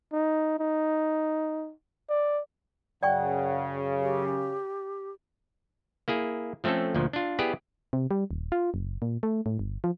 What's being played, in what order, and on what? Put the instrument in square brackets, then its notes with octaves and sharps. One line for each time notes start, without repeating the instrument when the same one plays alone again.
[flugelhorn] D#4
D#4
D5
[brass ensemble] F#2 C#3 [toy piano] D5 G5 C#6 [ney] F#5
[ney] G4
[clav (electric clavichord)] A#3 E4 G#4
F3 A3 C4 C#4 A4
D2 A#2 F3
D4 F4
B3 E4 G4 G#4 D5
[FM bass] C3
G3
D#1
F4
F#1
A#2
A3
A2
G1
F3